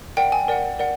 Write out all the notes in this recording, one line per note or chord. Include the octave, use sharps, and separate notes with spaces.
A#4 D5 F#5 G5
G#5
A#4 D5 F#5
A#4 D5 F#5